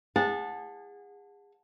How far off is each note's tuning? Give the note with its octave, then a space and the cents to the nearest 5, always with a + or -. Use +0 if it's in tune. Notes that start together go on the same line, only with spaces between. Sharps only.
G#4 -30 F#5 -25 A5 +0